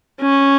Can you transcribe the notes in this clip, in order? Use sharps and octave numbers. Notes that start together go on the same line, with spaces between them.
C#4